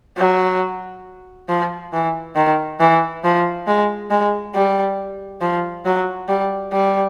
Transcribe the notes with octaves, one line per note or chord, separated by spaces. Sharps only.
F#3
F3
E3
D#3
E3
F3
G#3
G#3
G3
F3
F#3
G3
G3